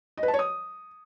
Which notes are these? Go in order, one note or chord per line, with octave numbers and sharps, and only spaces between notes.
D#5
B4
A5
C#5
D#6